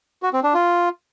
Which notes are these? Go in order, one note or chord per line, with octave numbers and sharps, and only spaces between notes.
F#4
C4
D4
F4